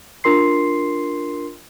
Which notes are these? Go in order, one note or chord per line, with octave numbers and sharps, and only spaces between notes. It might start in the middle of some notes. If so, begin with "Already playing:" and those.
D4 F4 A#4 C6 C7